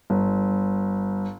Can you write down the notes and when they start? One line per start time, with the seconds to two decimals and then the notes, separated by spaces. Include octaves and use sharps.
0.10 G1